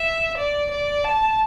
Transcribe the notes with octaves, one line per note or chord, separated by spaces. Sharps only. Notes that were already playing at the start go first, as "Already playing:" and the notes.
Already playing: E5
D5
D5
A5